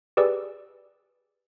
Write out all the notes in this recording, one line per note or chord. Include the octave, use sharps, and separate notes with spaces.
G4 G#4 B4 D5 E6